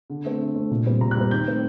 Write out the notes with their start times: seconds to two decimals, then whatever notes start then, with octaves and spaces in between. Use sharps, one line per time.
0.10 D3
0.25 A3 C4
0.40 D3
0.56 A3 C4
0.71 A#2
0.86 G3 C4
1.01 A#2 A#5
1.11 F#6
1.16 G3 C4
1.31 D#3 G6
1.47 A3 C4